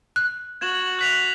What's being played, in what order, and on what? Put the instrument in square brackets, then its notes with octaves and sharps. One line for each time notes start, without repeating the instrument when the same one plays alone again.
[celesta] F#6
[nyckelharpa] F#4 [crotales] G#6 E7 F#7
[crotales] F#6 B6 F7